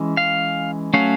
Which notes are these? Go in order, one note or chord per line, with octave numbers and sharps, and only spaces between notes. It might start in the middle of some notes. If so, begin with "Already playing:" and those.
Already playing: E3 G#3 C#4
F5
F#3 A3 C#4 F5